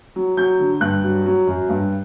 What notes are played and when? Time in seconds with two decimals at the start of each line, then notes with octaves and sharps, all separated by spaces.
0.16 F#3
0.37 F#3 G6
0.59 D3
0.81 G2 F#6
1.03 F#3
1.26 F#3
1.47 F#2
1.69 G2